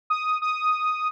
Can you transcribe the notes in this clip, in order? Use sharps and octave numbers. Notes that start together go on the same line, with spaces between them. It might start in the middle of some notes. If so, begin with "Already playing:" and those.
D#6
D#6